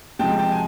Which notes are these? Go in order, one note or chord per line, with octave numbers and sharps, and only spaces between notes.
C3 F3 G#3 G5 A5
G5 A5
G#5